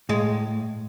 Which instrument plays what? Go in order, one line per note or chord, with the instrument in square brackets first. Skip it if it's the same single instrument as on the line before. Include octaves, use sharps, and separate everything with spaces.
[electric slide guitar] A2 [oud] G#3